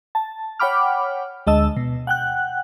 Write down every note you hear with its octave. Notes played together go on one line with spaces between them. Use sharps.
A5
C#5 F#5 G5 B5 D6 F6
D2 G#3 D#5 A5 E6
B2
F#5 G5 F#6